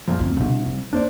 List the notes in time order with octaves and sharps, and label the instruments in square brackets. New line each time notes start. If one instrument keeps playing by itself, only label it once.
[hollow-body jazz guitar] F#2 A#2 F3
[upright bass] D2 C4
[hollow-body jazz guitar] C2 G2 [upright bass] B2 D4
[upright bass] F#3
[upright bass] D#2 [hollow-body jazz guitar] D4 C5 D5